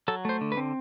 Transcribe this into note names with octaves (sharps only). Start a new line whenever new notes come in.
F#3 A4
A3 C5
D3
B4
C4